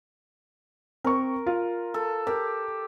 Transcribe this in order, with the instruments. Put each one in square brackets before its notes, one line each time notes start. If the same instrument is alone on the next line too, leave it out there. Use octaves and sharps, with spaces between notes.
[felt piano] C4 C#6 [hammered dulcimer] A#4
[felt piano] F4
[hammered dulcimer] A4
[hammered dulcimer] G4 [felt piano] A#4